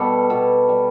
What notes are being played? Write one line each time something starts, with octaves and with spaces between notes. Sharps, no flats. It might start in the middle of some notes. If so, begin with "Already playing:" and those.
Already playing: B2 G3 A4
B2
G3